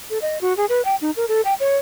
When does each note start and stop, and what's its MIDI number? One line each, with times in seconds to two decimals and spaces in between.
0.10 0.18 69
0.22 0.38 75
0.41 0.56 66
0.57 0.65 68
0.69 0.84 71
0.85 0.95 79
1.01 1.11 63
1.16 1.25 70
1.28 1.41 69
1.45 1.54 79
1.60 1.77 73